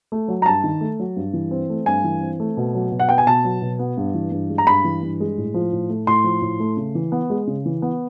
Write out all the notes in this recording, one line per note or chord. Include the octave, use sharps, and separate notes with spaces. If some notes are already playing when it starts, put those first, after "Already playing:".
A3
F#3
A#5
G2 A5
D#3
A3
F#3
G2
E3
C4
A3
G2 G#5
E3
C4
A3
B2
F#3
B2
F#5
B3 G5
G#5
B2 A5
F#3
B2
B3
G2
E3
G2
G#3
A#5
G2 B5
E3
G2
G#3
A2
F3
A2
A3
A2 C6
F3
A2
A3
C#3
E3
B3
G#3
C#3
E3
B3